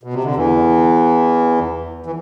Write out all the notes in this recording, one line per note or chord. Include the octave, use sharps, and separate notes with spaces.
B2
C3
D3
E2 E3
E3